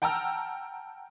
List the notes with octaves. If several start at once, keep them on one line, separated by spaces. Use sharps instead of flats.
F#5 G5 A5 A#5 E6 F6